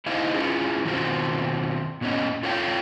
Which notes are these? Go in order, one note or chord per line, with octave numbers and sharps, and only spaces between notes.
D#4 E4 C5 D#5 F5
C#4 E4 F4 G#4
B2 D#3 C4 F4 F#4 C5
A#2 B3 C#4 D#5
F4 A4 C#5 F5 G5